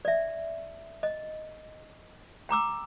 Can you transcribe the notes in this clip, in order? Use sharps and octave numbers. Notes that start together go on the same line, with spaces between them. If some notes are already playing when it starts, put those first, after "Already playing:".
D5 E5
D#5
G5 A#5 D6 E6